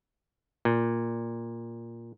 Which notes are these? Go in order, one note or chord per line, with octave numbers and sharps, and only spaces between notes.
A#2